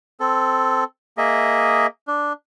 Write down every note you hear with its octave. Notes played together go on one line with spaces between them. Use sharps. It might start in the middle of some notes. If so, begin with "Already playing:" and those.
C4 A4
A#3 G#4 D#5 E5
D4